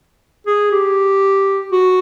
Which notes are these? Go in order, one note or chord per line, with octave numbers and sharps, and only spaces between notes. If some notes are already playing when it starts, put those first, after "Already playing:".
G#4
G4
F#4